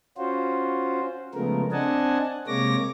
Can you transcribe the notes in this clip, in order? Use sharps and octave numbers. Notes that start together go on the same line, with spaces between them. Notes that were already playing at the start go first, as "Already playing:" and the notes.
C#4 F4 F#4 C5
C#3 F3 G#3 A3 B3 A#4
C4 D4 D#5 F#5 G#5 A5
C3 G#3 A#3 C#5 D6 A#6